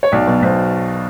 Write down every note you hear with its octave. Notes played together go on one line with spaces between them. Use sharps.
C#5
B1 D5
B2 F#3
B1 C5